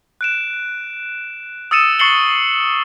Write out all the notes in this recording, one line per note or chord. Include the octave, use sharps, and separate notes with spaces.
F#6 D7 E7
D#6 E6 A6 C#7 D#7 E7
C#6 A6 C7 C#7 F#7 G7